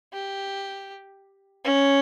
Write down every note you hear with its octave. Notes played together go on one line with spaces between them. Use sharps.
G4
C#4